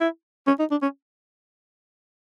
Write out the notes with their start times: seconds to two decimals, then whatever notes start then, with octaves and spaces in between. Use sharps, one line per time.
0.01 E4
0.47 C#4
0.59 D#4
0.71 D4
0.82 C#4